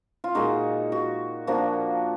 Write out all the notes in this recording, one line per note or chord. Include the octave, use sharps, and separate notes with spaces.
F4
A#2 G#3 D#4 F#4
F#4
F3 A#3 D4 F#4